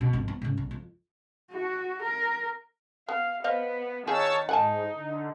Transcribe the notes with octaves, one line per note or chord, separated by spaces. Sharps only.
B2
G#1 F2
B3
G#2 C#3
B1
F2
F#4
A#4
B3 F5
B3 C5 D#5 F5
D#3 D#4 F4 G#4 C#5 A5 E6
G#2 D#4 F#5 G#5 A5
D3